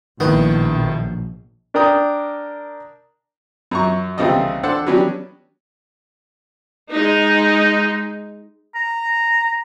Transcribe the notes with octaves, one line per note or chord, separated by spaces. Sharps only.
A#1 A2 D#3 B3
D4 A#4 D5 G5 A#5 D#6
F#2 A#5 C#6
C2 C#3 B3 C4 A4 D#5
D4 A4 C5 D5 F#5
F#3 B3 C#4 D4 G4
G#3 D#4
A#5